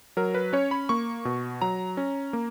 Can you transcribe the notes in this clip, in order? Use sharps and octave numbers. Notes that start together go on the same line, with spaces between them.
F#3 A#4
B4
C#4 C#5
B5
A#3 C#6
B2
F#3 A#5
C#4
A#3